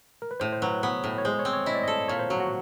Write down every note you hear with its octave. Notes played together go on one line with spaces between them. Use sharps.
A#4
B4
A2 C5
C5
F#3 B4
B3 C#5
A2
C#5
G#3 C5
C#5
C4
C#5
E4 D#5
D5
A4 D#5
A#2 C#5
C5
F#3 F#4
F#4